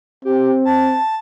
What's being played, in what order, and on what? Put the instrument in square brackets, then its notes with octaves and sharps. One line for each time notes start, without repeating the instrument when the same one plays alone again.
[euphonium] C4 [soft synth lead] G4
[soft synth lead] A5